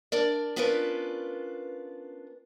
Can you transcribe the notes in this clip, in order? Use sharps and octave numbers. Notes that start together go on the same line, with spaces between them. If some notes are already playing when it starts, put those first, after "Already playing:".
D4 A#4 D5
B3 C#4 D4 F4 A#4 B4